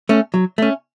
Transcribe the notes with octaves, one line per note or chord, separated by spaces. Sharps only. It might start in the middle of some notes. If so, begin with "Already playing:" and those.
A3 C#4
F#3
A3 C#4